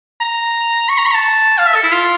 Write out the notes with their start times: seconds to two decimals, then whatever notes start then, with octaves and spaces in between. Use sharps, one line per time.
0.21 A#5
0.89 C#6
0.98 A#5
1.06 C#6
1.11 A#5
1.15 A5
1.58 F5
1.66 E5
1.75 A4
1.83 E4
1.92 F4